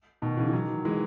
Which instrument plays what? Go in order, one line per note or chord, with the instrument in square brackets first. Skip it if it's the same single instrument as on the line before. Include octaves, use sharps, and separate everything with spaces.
[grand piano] B2 D#3
C#3 E3
E3
D#3 F#3
E3 G#3